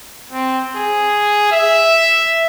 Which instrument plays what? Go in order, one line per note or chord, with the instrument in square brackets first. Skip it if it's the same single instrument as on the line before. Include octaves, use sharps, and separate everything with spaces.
[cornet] C4
G#4
E5